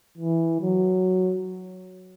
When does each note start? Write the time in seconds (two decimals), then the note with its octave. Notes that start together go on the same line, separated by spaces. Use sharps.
0.18 E3
0.62 F#3